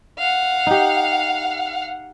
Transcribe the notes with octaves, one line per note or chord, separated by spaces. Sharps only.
F5 F#5
D#4 G4